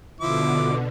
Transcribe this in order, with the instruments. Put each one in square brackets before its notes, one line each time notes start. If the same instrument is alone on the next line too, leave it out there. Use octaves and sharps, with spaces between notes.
[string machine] B2 D3 [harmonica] F3 E4 D6